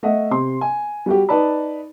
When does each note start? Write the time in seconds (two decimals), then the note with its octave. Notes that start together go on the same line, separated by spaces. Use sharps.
0.03 A3 D#5 E5 F#5
0.31 C3 C6
0.61 G#5
1.06 G3 F#4 G4
1.29 D#4 B4 D5 A5 B5